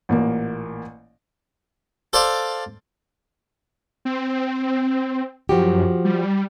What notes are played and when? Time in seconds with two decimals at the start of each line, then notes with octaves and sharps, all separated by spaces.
0.09 A1 A#2 A#3
2.13 A4 C5 D5 F5
4.05 C4
5.49 F#2 F3 F#4 G4
6.05 G3